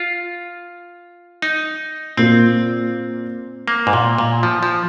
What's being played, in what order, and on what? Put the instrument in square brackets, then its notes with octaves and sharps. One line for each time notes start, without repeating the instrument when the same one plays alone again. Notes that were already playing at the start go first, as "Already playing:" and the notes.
Already playing: [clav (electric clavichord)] F4
D#4
[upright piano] A#2 A#3 F4 [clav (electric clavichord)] C4
[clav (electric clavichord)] A#3
G#2
A#2
A#2
F3
F3